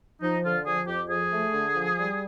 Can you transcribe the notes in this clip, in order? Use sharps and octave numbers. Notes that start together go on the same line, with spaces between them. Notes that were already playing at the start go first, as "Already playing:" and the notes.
F3 D#4
D3 F4
F3 G#4
F2 G4
F3 G#4
A3
D3
F3
G3